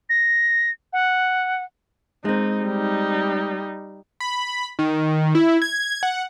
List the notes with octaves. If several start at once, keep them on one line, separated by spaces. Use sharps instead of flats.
A#6
F#5
G#3 C4 D#4
G3 D#4
B5
D#3
E4
G#6
F#5